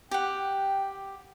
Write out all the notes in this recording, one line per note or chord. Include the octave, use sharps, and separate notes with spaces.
G4 F#5 G5